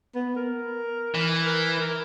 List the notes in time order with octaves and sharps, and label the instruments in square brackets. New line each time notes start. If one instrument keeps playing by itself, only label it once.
[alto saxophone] B3
A#4
[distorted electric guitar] E3
[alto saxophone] A#4
A#4